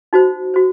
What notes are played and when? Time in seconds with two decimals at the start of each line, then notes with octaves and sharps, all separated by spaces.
0.13 D#4 F#4 C5
0.54 F#4 C5